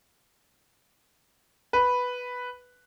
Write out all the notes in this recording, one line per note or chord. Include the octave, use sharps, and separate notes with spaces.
B4